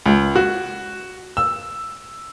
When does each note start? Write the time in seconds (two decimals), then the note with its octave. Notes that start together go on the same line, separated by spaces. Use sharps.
0.06 C#2
0.36 F#4
1.37 E6